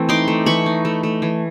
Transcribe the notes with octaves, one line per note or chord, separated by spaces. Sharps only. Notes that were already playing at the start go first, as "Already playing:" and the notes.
Already playing: E3 A3 C4
D#4 C6 D6
A3
E3 B5 C#6
D#4
A3
A3
E3